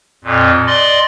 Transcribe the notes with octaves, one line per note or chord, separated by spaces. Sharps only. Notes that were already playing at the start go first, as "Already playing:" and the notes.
F2 A#2
D5 D#5 C6